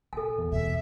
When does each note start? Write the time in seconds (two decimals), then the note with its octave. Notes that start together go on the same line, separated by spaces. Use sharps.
0.13 A#2 A4 G#5
0.38 E2
0.52 B2 E5